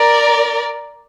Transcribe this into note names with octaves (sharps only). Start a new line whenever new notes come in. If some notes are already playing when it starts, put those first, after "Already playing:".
Already playing: A#4 D5